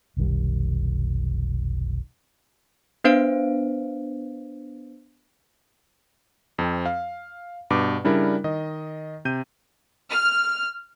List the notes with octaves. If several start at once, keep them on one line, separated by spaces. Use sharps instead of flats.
F1 B1 D#3 G3
B3 D4 B4 C5 F5 D7
F2 C4
F5
G2 B2 D6
C#3 G3 D4 E4 A#4
D#3 D#5
C3 G6 D#7
F6